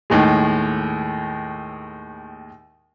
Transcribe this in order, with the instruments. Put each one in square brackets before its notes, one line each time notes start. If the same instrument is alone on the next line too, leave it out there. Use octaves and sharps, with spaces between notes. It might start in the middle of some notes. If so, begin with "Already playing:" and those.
[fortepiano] D#2 A2 D#3 G#3